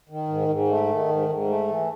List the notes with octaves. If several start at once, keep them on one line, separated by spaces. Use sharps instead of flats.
D#3
G#2
G#2
A3
D#3
G#2
G#2
A3
E3